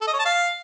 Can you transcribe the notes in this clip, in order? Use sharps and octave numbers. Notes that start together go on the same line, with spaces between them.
A4
D#5
C#5
A5
F5